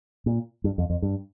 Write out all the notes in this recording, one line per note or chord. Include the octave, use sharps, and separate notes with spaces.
A#2
G2
F2
F2
G2